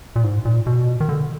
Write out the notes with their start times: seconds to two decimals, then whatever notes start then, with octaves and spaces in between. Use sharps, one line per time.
0.16 A#2
0.24 G#2
0.45 A#2
0.67 B2
1.00 D#3
1.09 D3